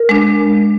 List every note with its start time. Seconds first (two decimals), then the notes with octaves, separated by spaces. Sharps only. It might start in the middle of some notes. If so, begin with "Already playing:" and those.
Already playing: A#4
0.09 G#3 D4